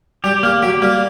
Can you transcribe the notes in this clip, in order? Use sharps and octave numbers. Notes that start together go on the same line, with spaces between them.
G3 G4
G3 A#3
F#3 G4
G3 A#3